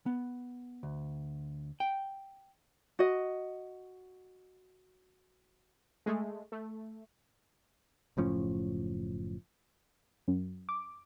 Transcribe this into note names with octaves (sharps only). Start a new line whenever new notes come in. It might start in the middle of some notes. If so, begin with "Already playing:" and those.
B3
D2
G5
F#4 D#5
G#3 A3
A3
F#1 A2 F3 C#4
F#2
D6